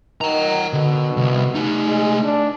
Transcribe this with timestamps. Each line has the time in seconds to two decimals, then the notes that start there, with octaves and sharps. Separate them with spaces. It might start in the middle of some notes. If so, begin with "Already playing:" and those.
0.21 D#3 F#5 A#5
0.73 B2 D3
1.17 C2
1.55 A3 D#4
1.87 G#3
2.24 D4